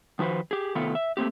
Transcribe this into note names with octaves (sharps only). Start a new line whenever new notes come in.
D#3 F3 F#4 B4 C5
G4 G#4
C3 D#3 A3 B3 F4 A4
E5
A3 A#3 C4 G4